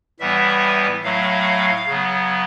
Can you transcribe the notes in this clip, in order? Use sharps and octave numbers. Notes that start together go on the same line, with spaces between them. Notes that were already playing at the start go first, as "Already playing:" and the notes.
A2 E3 G3 B3 E5
A2 F#3 A3 F5
C#3 F#3 B3